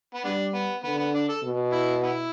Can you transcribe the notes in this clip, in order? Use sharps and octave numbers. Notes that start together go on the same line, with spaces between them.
B3
G3 B3 D4
B3
D3 B3
B3
D4
A4
B2
E4
B3 E4